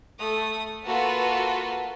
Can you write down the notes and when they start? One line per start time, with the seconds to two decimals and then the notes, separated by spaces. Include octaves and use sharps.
0.19 A3 D#6
0.85 A#3 F4 F#4 A4 B4